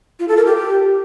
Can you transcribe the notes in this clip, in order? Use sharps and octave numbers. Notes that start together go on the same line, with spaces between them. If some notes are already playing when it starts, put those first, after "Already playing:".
F4
A4
A#4
G4